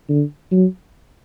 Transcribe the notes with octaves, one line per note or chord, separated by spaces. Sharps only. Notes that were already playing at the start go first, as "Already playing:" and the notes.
D3
F#3